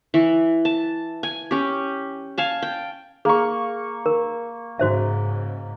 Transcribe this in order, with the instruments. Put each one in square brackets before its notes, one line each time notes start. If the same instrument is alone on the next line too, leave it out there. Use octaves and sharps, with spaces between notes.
[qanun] E3
A5
G#5
C#4 G4
F5 G#5 A5
G5
[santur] A#3 C#6 [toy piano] G#4
[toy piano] A#4
[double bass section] G#2 C#3 [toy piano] F#4 C5 E5